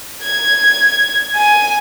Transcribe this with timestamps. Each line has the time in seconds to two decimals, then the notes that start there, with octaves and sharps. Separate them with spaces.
0.23 G#6
1.36 G#5